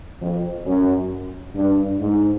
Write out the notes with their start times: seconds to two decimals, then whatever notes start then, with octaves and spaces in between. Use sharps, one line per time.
0.22 F2
0.66 F#2
1.55 G2
2.00 G#2